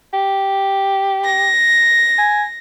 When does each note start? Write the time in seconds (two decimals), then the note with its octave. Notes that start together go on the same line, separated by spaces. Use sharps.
0.13 G4
1.24 A#6
2.18 G#5